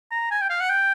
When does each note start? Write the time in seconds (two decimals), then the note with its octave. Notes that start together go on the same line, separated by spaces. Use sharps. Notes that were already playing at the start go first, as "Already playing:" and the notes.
0.11 A#5
0.31 G#5
0.41 G5
0.50 F5
0.60 F#5
0.70 G5